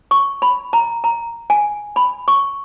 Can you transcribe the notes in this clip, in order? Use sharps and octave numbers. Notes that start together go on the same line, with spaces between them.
C#6
B5
A#5
A#5
G#5
B5
C#6